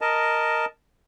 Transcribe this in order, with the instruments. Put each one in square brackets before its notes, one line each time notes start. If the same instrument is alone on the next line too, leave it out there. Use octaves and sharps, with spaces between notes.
[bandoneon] A#4 D#5 A5